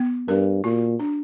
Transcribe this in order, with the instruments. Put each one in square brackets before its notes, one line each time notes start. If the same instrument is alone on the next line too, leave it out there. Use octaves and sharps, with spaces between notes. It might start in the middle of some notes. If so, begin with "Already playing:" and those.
Already playing: [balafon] B3
[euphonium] G2 [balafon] A#4
[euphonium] A#2 [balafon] F#4
[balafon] D4